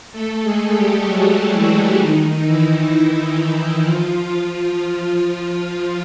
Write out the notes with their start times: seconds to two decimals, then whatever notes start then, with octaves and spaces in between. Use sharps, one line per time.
0.12 A3 A4
0.43 G#3 G#4
0.75 G3 G4
1.05 F#3 F#4
1.52 E3 E4
1.99 D#3 D#4
2.45 E3 E4
3.85 F3 F4
5.71 F3 F4